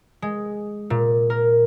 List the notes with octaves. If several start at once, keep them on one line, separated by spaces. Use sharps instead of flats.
G#3
A#2
A#4